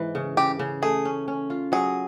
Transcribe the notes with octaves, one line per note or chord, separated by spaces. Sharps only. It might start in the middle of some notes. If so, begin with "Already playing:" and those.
Already playing: G#2 E3
C#3
C#3 G4
C#3
A3 G#4
C#4
C#4
F4
F#3 G#4